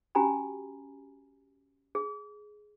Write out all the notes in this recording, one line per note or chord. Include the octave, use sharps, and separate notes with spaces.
C#4 F#4 G4 G#5 A#5 B5
G#4